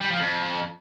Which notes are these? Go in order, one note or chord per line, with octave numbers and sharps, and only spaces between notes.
G3
F3
F2